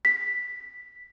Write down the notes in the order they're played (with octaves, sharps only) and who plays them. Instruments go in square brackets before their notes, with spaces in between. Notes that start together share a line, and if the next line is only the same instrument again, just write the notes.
[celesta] B6